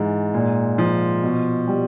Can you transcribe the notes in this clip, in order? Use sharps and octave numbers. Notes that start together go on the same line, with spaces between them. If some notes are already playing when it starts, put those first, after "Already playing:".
Already playing: G#2 E3
A#2
F3
B2
G3